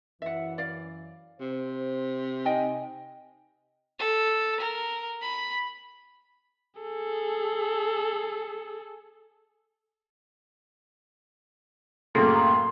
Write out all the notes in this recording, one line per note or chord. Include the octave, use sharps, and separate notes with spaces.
F#2 E3 E5 F#5
D5 F5
C3 C5
D#4 D#5 G5 G#5
A4
A#4
B5
G#4 A4
F#2 A2 C#3 A#3 A4 C6